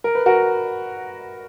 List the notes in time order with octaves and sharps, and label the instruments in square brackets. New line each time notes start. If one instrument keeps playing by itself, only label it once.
[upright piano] A#4
B4
F#4 A#4